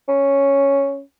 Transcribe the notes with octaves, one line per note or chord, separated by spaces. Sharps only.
C#4